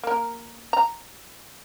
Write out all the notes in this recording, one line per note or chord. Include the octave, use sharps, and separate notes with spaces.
A#3 A#4
A#5